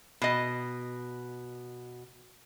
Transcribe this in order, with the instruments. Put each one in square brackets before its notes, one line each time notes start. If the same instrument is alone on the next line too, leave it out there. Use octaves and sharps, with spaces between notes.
[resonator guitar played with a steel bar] B2 D#5